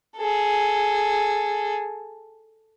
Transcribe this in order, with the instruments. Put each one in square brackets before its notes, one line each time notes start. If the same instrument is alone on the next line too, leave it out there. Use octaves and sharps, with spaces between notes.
[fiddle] G#4 A4